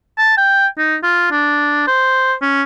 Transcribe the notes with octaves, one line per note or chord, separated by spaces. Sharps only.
A5
G5
D#4
F4
D4
C5
C#4